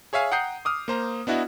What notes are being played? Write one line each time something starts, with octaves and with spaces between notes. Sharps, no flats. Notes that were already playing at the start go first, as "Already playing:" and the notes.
G#4 C#5 E5 F5 G#5
F#5 G5 A#5 D#6 G6 C7
D6 D#6 F6
A#3 C5 A#5
B3 D4 E4 F#4 D#5